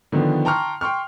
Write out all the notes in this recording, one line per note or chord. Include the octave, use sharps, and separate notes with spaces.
D3 D#3 F3 B3
G5 A5 A#5 C6 C#6 F6
G5 C6 C#6 F6